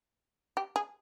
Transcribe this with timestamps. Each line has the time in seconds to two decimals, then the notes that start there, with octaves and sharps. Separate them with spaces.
0.57 G4
0.76 G#4